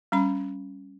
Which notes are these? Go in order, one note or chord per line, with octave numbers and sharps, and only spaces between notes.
G3 C#4 B5